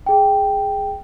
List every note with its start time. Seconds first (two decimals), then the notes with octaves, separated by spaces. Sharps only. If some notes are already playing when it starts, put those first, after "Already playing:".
0.06 G#4 G5